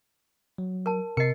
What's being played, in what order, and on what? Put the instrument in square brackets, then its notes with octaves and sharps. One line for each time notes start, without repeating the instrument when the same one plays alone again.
[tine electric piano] F#3
[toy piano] A#4 A5
[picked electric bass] C3 [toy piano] A#4 D#5 [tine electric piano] C7 C#7